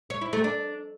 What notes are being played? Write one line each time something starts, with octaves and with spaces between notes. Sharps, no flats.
C#5
E4
A3
D4